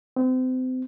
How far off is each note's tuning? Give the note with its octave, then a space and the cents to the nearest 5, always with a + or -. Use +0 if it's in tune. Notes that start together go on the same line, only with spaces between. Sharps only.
C4 -35